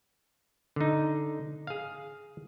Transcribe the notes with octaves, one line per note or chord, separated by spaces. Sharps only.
D3 D#4
G#4 F5